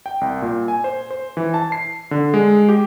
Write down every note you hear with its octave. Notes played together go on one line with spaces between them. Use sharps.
G5
C2
A#2
G#5
C5
C5
E3
A5
C7
D3
G#3
G4